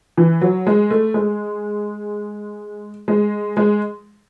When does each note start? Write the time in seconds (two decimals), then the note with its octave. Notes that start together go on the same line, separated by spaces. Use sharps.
0.17 E3
0.41 F#3
0.67 G#3
0.91 A3
1.14 G#3
3.08 G#3
3.57 G#3